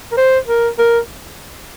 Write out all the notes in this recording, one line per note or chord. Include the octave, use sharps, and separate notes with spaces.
A#4
C5
A#4
A#4